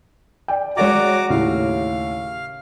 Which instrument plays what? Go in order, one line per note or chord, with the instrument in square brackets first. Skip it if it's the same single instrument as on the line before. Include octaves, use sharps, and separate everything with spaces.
[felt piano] D5 G5
[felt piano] G#3 C#5 D5 [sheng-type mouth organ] F#4 A#5 D6
[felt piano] D#2 A2 C#3 [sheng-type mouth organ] F5